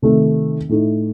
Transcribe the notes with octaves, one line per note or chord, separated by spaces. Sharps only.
C3 D#3 A3
A2 A3 D#4